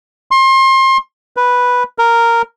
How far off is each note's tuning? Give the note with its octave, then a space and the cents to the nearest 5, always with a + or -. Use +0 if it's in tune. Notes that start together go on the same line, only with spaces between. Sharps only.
C6 +30
B4 -5
A#4 -5